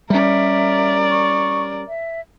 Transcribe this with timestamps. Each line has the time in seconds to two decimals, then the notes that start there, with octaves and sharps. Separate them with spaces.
0.10 G3 C#4 A#4 D5 E5
1.10 C#6
1.88 E5